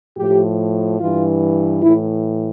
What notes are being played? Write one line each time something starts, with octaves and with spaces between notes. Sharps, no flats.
A2 F3 G4
G2 E3 F4
A2 E3 E4